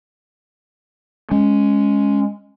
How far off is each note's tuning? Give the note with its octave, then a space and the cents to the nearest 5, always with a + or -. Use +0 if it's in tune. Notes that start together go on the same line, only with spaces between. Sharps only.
G#3 +0 C#4 +0